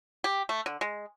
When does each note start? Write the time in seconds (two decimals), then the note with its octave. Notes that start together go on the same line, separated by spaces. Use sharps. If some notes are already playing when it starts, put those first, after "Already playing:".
0.24 G4
0.49 A3
0.66 D3
0.81 G#3